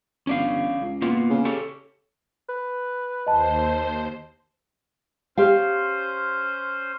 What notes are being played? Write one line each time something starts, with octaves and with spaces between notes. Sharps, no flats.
G1 C#4 D5 F5
C#2
A#3 B3 F4
C#3
G4 A4 C#5
B4
D#2 C5 D#5 A5
C#4 G4 C5 F5